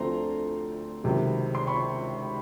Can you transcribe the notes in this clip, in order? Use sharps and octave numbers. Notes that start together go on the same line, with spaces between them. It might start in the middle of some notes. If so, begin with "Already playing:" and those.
Already playing: D2 D3 F3 A3 C4 A#5 C6
C#2 C3 D#3 F#3
C6
B5 C#6